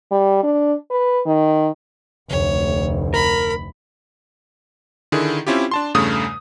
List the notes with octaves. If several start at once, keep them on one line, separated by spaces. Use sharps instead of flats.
G3
D4
B4
D#3
F1 D2 C#5
A#4 B5
D3 D#3 E4 G#4
C4 C#4 E4 F4 G4
D4 A5 C6
E2 G2 C#3 A3 D#6